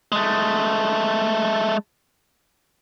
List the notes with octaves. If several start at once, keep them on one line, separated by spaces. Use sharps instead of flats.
G#3 A3